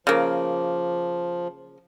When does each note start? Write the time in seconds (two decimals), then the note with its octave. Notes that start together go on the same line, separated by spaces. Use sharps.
0.07 C#3 F3 A#3